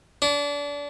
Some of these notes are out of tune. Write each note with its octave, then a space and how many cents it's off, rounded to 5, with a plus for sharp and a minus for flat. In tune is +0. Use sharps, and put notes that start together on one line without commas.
D4 -30